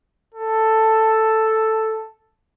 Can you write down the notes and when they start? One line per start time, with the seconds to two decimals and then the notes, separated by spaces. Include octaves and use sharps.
0.34 A4